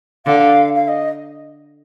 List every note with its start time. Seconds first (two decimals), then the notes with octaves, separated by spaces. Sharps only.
0.26 D3 F5
0.75 F5
0.88 D#5